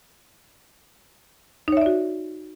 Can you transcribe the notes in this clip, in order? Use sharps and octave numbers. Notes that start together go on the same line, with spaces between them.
D#4 F#4 C#5 D5 E5